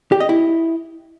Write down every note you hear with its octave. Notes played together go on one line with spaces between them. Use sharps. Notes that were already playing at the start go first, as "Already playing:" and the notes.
G4
D#5
E4